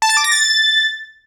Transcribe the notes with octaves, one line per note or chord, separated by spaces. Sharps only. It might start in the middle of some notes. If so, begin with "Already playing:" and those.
A5
A6
D6
A#6
A6